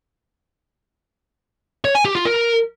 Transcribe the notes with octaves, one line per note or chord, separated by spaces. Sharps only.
C#5
G#5
G4
F4
A#4